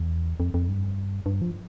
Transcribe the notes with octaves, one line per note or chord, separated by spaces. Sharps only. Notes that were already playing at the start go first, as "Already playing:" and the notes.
Already playing: E2
F2
F2
G2
G2
F3